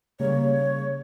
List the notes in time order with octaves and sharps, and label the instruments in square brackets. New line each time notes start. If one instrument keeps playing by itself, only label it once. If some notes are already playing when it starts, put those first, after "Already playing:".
[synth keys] C#3 G3 A#3 [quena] C#5